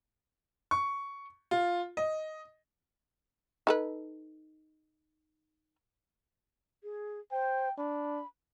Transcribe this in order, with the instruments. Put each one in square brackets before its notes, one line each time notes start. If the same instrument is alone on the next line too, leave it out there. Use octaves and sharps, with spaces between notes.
[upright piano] C#6
F4
D#5
[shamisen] D#4 A4 B4
[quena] G#4
[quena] C5 [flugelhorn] G5
[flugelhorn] D4 [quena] B5